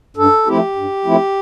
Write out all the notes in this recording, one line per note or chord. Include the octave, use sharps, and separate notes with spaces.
G2 A4
F3 A3 C4 E4 G4
G2
F3 A3 C4 E4